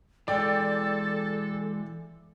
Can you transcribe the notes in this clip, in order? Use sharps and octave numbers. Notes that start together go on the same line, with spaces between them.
E3 G#3 A4 D5 G5